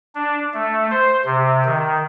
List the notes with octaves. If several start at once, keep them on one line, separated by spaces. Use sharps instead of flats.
D4
A3
C5
C3
D#3